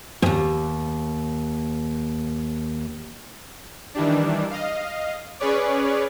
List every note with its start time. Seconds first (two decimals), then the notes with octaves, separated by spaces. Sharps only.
0.22 D#2 G#2
3.94 D#3 E3 G3 D4
4.51 D#5 F5
5.40 C#4 G#4 B4 C#5 D5